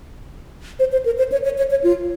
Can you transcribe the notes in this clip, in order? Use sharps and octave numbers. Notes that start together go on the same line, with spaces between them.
C5
C5
A#4
C5
C#5
C#5
C#5
C#5
F4